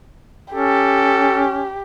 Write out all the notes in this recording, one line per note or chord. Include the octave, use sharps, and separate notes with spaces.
C#4 G4 A4